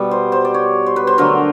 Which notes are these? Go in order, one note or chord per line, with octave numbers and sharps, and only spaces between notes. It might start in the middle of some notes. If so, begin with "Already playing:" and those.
Already playing: B2 G3
C5
C5
D5
C#5
C5
B4
C5
D3 F#3 A3 A#4